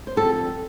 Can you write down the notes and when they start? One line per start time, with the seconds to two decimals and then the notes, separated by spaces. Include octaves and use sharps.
0.07 C5
0.16 F2 D3 G3 A4